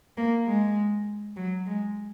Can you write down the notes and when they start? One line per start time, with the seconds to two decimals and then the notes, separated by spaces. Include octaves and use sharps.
0.18 A#3
0.47 G#3
1.36 F#3
1.66 G#3